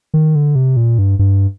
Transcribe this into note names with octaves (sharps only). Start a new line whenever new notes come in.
D#3
D3
C3
A#2
G2
G2